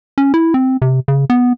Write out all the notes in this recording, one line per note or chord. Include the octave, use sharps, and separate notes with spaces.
C#4
E4
C4
C3
C#3
B3